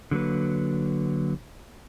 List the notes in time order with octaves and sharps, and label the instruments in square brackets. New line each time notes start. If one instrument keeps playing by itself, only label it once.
[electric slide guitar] D3 F#3 A#3 B4